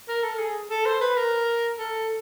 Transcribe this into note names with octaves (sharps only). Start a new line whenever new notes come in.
A#4
A4
G#4
A4
C5
B4
A#4
A4